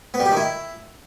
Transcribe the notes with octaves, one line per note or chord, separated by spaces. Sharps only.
B3
G3
G4
D#3
E4